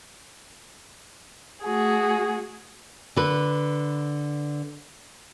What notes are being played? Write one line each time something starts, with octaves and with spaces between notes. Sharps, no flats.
A3 F#4 G#4
D3 B4